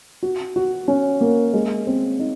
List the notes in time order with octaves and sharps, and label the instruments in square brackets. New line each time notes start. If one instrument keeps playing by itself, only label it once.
[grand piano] F#4
F#4
C#4
A#3
G#3
C4
D#4